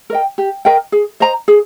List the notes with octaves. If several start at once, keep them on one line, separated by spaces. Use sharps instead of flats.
A#4 D#5 G5
G4
A#4 D#5 G5
G#4
C5 D#5 A#5
G#4